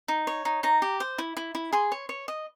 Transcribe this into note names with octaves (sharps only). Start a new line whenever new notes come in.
D#4
C#5
D#4
D#4 A#5
G4
C5
E4
E4
E4
G#4 C6
C#5
C#5
D#5